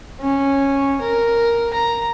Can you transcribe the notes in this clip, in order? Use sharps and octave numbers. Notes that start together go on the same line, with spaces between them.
C#4
A#4
A#5